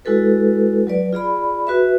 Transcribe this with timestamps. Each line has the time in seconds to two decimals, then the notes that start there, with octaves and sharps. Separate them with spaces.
0.05 G#3 E4 F#4 A4 B4
0.87 F#3 B4 D5
1.13 F4 G#4 D5 B5
1.67 F#4 B4 E5